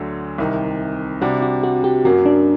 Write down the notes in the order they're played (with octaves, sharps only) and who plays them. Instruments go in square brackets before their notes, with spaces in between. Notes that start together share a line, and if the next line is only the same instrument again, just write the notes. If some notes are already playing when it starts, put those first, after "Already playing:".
Already playing: [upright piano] D2 D3 F#3
C2 C3 D#3
[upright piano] C3 G3 D4 [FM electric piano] F#4
[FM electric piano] F#4
F#4
G4
[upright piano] F#2 F#3 A#3 [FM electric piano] F#4
[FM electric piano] D4